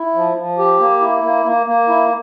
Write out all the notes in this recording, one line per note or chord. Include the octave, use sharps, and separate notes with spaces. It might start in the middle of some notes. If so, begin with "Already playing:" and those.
Already playing: E4
F3
F3
G4
A#3
E4
A#3
A#3
A#3
E4